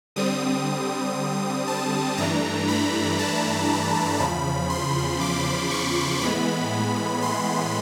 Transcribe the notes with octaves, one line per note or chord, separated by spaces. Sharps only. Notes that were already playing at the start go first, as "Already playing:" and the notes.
D3 G3 C4 D#6
A5
G2 E3 A3 D4 A#5
B5
A5
E2 C#3 F3 B5
C6
D6
C#6
A2 E3 G#3 B3 B5
C6